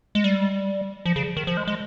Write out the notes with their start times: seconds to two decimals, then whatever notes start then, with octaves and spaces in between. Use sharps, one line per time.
0.15 G#3
0.24 G3
1.06 F3
1.16 C#3
1.37 D#3
1.47 F3
1.57 G#3
1.67 G#3